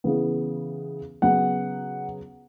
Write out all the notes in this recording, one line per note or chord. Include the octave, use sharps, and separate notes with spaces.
C#3 E3 B3
C#3 F#3 B3 F#5